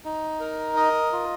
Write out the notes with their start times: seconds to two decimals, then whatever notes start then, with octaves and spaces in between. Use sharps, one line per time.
0.05 D#4
0.40 A#4
0.76 D#5
1.12 F4